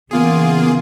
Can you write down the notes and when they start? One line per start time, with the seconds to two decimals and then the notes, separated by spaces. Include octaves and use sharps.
0.11 C#3 E3 A#3 B3 F4 G#4